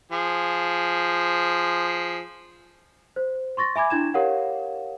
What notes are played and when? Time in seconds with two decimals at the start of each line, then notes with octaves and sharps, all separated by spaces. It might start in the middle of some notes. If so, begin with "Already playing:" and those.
0.12 F3 G#4
3.16 C5
3.57 C6 C#6 A6 A#6
3.76 E5 G#5 B5 D6 G#6
3.90 D4 E4 G#6 E7
4.14 G4 A#4 C#5 F5 F#5